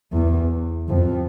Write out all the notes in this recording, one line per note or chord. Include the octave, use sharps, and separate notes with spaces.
E2
F2